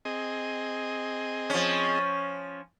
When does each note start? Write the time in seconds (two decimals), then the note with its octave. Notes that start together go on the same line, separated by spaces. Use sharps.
0.05 C4 G#4 D#5
1.50 F3 C#4